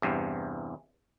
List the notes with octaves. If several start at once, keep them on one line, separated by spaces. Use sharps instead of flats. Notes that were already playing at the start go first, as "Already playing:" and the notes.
E2 G2 C3